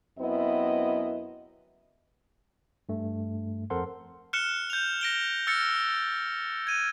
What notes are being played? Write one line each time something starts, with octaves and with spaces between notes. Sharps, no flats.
F#2 B3 C4 E4 D#5
G2 A3
F2 A4 A#4 C5 F#5 C6
F6 F#6 C#7 E7 G7
G6 F7
A#6 D7 G7
E6 F6 A6 C#7
G#6 D#7